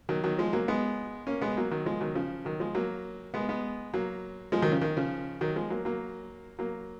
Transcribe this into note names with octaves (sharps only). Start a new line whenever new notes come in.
D#3 F#3
D#3 F#3
F3 G#3
F#3 A#3
G#3 B3
A#3 C#4
G#3 B3
F#3 A#3
D#3 F#3
F3 G#3
D#3 F#3
C#3 F3
D#3 F#3
F3 G#3
F#3 A#3
G#3 B3
G#3 B3
F#3 A#3
F3 G#3
D#3 F#3
C#3 F3
D#3
C#3 F3
D#3 F#3
F3 G#3
F#3 A#3
F#3 A#3
F#3 A#3